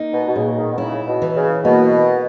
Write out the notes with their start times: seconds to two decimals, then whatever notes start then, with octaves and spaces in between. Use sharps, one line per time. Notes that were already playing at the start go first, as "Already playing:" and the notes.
Already playing: A#3 D#4
0.13 B2
0.28 B2
0.35 A#2 C#3
0.57 D#3
0.72 B2
0.78 C#3 E4
1.07 B2
1.22 E3
1.36 C#3
1.64 B2 A#3